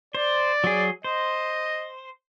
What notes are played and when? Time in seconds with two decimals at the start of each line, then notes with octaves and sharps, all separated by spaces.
0.15 C5 D5
0.64 F#3 G#4
1.04 C5 D#5